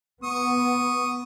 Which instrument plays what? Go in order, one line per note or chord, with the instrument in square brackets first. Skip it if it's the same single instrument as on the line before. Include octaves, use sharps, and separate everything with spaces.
[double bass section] B3 [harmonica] C#6 D#6